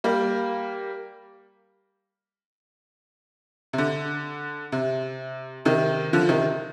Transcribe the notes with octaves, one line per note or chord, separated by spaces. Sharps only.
G3 A#3
C3
D3
C3
C3 D#3
D3 F3
C3 D#3